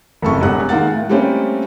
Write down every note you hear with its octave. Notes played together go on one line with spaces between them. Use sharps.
F#1 F2 A2 A4 A5 C#6
E1 E2 G3 F#5 F#6
D#3 G#3 A#3 F#5 A6
A2
G3 A3 A#3 C4 C#4